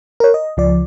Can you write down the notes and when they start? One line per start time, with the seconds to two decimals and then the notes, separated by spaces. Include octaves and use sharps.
0.20 A#4 C#5
0.34 D#5
0.57 C#2 F3 D5